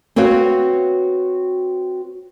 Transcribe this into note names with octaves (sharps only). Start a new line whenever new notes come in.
C4 F#4 B4 C#5 F5